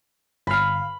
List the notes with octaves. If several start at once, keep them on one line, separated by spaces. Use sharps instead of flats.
G1 F5 B5